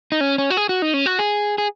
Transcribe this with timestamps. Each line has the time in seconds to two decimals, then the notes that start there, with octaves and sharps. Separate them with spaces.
0.12 D#4
0.21 C#4
0.38 C#4
0.50 F#4
0.57 G#4
0.69 F#4
0.82 D#4
0.94 C#4
1.06 F#4
1.19 G#4
1.58 G#4